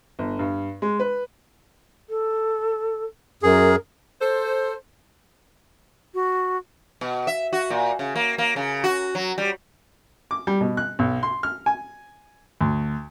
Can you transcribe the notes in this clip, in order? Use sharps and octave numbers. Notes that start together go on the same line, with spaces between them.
G1
G2
G#3
B4
A4
F#2 G#4 A#4
A4 C5
F#4
B2
E5
F#4
A#2
C#3
A#3
A#3
C#3
F#4
F#3
G3
D6
G3
B2
F#6
B1
C6
F6
G#5
D2